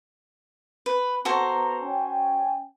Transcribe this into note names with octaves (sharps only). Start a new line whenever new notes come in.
B4
B3 F#4 A4 C5 A#5
C#4 G5 G#5